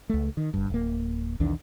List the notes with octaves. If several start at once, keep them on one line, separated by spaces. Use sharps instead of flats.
C#2 A3
D#3
G1 G2
D1 A#3
B1 E2 D#3 D4